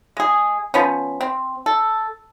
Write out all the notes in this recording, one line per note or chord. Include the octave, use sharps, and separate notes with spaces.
G#3 G#4
F3 B3 C#4
C4
A4